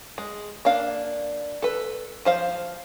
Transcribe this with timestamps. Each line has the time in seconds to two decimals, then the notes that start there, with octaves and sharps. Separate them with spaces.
0.18 G#3
0.65 A#3 D4 F5
1.62 A4 B4
2.25 F3 C5 F5